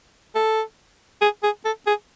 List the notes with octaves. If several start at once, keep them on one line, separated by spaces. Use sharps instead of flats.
A4
G#4
G#4
A4
G#4